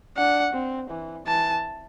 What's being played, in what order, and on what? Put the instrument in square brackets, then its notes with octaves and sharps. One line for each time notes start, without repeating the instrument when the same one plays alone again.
[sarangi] D4 [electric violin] F#5
[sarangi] C4
E3
[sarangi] E3 [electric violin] A5